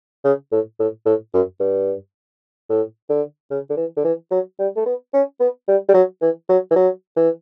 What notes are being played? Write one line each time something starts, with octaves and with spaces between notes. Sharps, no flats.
C#3
A2
A2
A2
F#2
G2
A2
D3
C#3
D3
E3
D3
E3
F#3
G3
A3
B3
C#4
B3
G3
G3
F#3
E3
F#3
E3
F#3
E3